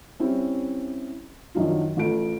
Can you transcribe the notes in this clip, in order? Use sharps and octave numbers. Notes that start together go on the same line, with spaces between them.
G3 C4 C#4 E4
F#2 D#3 F3 F#3 D4 F4
A1 F4 A4 D7